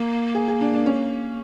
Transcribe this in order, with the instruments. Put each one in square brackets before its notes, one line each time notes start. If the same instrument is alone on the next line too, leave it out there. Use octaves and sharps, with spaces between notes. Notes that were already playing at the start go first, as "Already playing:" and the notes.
Already playing: [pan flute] A#3 [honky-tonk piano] A#4
[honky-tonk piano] G#4
G#4
D4
D4
C#4